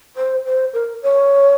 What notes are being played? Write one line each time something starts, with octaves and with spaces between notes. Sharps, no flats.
C5
C5
A#4
C#5